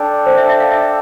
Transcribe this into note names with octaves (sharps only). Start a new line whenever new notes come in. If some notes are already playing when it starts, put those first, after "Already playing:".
Already playing: D4 A4 D5 G5
C5
E5
E5
F5
E5